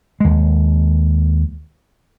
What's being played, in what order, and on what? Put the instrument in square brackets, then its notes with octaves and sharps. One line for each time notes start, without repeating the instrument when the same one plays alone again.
[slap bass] D#2 G#3